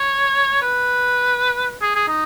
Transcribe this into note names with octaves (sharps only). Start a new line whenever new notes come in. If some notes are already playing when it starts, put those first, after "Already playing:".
Already playing: C#5
B4
G#4
G#4
D#4